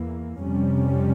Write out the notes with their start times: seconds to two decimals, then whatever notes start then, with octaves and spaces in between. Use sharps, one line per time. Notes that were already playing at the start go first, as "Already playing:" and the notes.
Already playing: E2 E3 A#3
0.40 F2 C3 G3 C#4